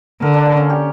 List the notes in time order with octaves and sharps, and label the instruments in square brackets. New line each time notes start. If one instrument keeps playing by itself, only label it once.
[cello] D3 [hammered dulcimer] A#4
[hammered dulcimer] D4
A#3
C#4
G4